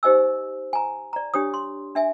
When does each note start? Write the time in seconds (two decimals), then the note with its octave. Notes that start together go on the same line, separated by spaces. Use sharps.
0.03 D#4 G4 C5 D#5 G#5 E6
0.73 G#5 A#5
1.13 D5 A#5
1.34 D4 G4 C#5 D#6
1.54 C6
1.95 D4 E5 G#5